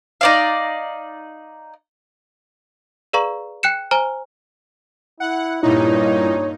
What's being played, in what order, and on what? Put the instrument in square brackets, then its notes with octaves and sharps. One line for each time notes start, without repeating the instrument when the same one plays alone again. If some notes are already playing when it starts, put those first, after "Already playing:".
[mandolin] D#4 D5 F5
[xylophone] G#4 B4 D5 F5 A#5 C#6
G5 F#6 C#7 E7
C5 G#5 A#5 F6
[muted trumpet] E4 [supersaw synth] F#5
[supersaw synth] G2 A#2 D#4 [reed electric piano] E4 [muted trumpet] C#5